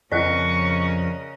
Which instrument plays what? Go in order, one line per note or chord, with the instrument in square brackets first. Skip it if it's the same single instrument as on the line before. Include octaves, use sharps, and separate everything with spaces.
[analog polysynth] F2 [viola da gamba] C#3 C#4 A#4 [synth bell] D5 D#5 F#6 [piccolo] C#6